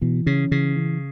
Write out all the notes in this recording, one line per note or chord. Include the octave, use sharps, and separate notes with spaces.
B2 E3
C#3 C#4
C#3 E3
E3